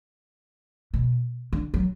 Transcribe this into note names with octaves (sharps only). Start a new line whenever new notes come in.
B2
D3
F#3